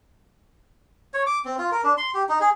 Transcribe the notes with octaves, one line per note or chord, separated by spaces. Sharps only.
C#5
D6
C4
F4
A#4
D4
C6
G4
D#4
G#4